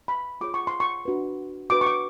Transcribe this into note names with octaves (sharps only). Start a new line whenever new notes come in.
B5
F4 G#4 C#5 D6
C#6
C6
C#6
D4 F#4 B4
D4 F#4 B4 D6
C#6
D6